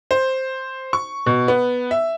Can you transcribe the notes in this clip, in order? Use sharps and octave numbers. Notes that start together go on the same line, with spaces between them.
C5
C#6
B2
B3
E5